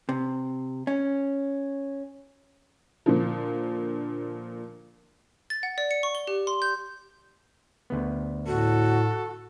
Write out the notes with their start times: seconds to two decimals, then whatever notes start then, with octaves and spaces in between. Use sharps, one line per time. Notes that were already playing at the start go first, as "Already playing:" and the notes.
0.09 C3
0.87 C#4
3.06 A#2 D3 F3
5.50 A6
5.63 F#5
5.78 D5
5.91 C#7
6.03 C#6
6.15 G7
6.27 G4
6.47 C6
6.62 G6
7.90 D2 B3
8.47 A2 F#4 A4